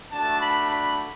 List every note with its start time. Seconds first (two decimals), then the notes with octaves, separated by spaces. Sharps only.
0.12 A3 D4 F#4 A5
0.41 B5
0.70 B5